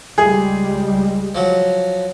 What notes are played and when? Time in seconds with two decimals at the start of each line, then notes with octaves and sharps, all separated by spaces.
0.18 C#2 G3 G#3 G#4
1.35 F3 F#3